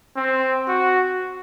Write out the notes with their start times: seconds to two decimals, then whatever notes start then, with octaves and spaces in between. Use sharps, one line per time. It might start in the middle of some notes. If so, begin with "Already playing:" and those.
0.16 C4
0.68 F#4